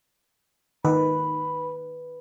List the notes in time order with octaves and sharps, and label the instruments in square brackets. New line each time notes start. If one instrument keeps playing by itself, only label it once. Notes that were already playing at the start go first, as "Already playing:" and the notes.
[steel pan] D#3 [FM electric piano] B4 [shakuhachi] B5